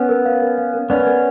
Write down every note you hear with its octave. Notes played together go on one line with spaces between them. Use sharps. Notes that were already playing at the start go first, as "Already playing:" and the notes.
Already playing: B3 C#4
A#4
F5
A#4
F5
A#4
B3 C#4 D5
A#4